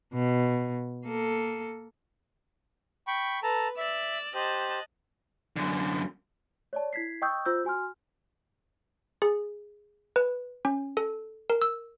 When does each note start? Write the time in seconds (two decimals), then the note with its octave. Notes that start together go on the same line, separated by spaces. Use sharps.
0.14 B2
1.06 A#3 A4
3.07 G5 B5 C#6
3.43 A4 B4 A5 A#5
3.78 D5 E5 E6
4.34 G4 C5 D#5 A5 F#6
5.56 F#2 D3
6.73 C#5 D5 A5
6.93 E4 G#6 B6 C7
7.22 D#5 G5 C#6 D#6 E6 G6
7.45 F4 C5 E6 G6
7.65 F#4 G#5 C6 F6
9.22 G#4
10.16 B4
10.65 C#4
10.97 A4
11.50 A#4
11.62 E6